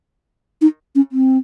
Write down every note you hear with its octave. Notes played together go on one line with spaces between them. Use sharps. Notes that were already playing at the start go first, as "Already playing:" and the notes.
D#4
C#4
C4